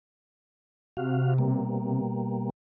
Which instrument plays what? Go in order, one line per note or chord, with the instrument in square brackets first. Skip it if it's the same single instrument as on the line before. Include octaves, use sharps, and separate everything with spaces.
[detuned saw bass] C3 [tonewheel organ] F#4 F5
[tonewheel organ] B2 G3 A#3